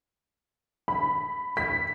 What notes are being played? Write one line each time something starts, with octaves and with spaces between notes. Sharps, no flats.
B5
B6